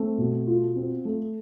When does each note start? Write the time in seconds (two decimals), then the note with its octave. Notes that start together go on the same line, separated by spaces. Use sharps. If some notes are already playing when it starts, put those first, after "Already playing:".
Already playing: A3 C4
0.18 B2
0.47 F4
0.76 C4
1.05 A3